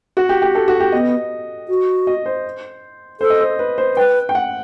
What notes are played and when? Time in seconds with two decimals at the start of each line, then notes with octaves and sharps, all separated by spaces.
0.17 F#4
0.29 G4
0.42 G4
0.55 A4
0.68 F#4
0.80 G4
0.92 B3 D#5
1.68 F#4
2.07 D#5
2.26 C5
3.20 A4 C5
3.30 D#5
3.40 C5
3.59 B4
3.78 C5
3.97 B4 G5
4.29 G5
4.35 F#5